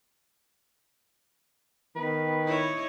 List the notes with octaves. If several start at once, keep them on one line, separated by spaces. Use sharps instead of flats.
D#3 B3 B4
D#4 E4 C#5